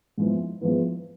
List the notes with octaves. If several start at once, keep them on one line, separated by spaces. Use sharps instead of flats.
G#2 F3 G#3 B3 E4
G#2 F3 G#3 B3 E4